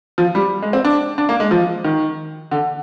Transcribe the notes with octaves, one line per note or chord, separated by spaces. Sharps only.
F3
G3
G#3
C4
D4
D4
A#3
G#3
F3
D#3
D3